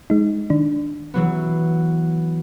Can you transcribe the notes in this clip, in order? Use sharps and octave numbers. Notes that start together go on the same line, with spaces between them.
G#3 D#4
D#3 D4
E3 F#3 B3